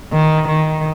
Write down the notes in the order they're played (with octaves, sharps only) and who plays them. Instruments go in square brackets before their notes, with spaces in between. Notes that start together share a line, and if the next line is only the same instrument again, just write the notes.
[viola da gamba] D#3
D#3